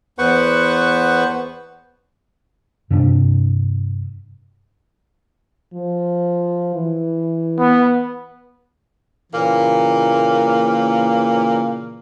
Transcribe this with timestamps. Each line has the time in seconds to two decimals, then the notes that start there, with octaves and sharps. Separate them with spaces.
0.19 E2 B3 B4 C5 F#5 C#6
2.90 G2 C3 A#3 D4
5.74 F3
6.75 E3
7.59 B3
9.33 A#2 C#3 E3 A#3